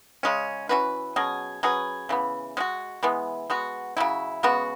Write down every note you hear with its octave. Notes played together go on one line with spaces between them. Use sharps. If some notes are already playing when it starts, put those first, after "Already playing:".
C#3 G#3 C#4
E3 C#4 F#4 B4
B2 F#3 C#4 G#4
F#3 C#4 G#4 B4
C#3 E3 B3
G#3 C#4 F#4
E3 G#3 B3
G#3 B3 F#4
C#3 F#3 E4
C#3 G#3 B3 F#4